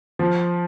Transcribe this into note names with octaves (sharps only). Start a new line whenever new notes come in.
F3